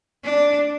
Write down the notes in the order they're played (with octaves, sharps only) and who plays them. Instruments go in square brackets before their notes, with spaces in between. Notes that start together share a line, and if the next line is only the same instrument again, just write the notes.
[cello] D4